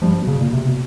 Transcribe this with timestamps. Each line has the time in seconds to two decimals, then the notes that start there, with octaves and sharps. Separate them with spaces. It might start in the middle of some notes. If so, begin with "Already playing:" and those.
0.02 G2 F3
0.21 B2
0.27 C#3
0.40 A#2
0.53 C3
0.66 B2